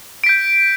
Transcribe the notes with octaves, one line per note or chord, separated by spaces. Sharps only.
G6 B6 D7